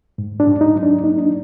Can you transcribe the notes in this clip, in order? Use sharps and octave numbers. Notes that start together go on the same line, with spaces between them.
G#2
D4
G#2
D#4
F#3
D4
A#3 D#4
D4